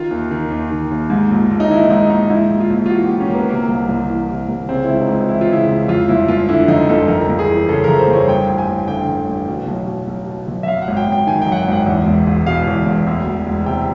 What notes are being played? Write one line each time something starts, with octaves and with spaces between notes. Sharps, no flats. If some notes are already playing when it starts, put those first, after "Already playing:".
Already playing: D#3 F4
D#2
D#3
D#2
D#3
D#2
G#2
A#1
A#1
D#4
D#3 E4
G#2 D#4
A#1 D#4
G#2 E4
A#1
F4
A#1
F4
E3 F#4
G#2 G4
C#4
A#1 A#3
B3
C3 A#3
C2
C2
E3
C3
C2
C#3 C4
C#2 E4
D#4
C#2
E3 E4
F4
C#3 E4
C#2
F2 F4
G1 E4
G1 F4
D3 E4
F2 D#4
G1 A4
F2 A#4
G1
G#4
E3
C#3 A4
F2 A#4
C5
G1
C#5
G2 G5
A1
G#5
A1
D3 G5
G2
A1
B2
B1
B2
B1
B2
B1
E5
F#2 F5
F#5
G#1
G5
G#1 G5
D#3 G#5
F#2 G5
F#5
G5
G#1 F#5
E2
E1
E1
B2 F5
E2
E1
D2
E1
E1
C3 G5